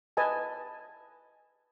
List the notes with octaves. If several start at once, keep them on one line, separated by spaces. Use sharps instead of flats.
B4 D#5 G#5 A5